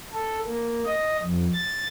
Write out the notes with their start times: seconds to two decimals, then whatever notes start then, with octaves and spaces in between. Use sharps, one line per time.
0.13 A4
0.46 A#3
0.85 D#5
1.23 F2
1.54 A6